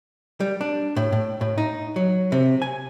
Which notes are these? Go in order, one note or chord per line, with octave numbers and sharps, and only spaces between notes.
G3
D4
A2
A2
A2
D#4
F#3
C3
G#5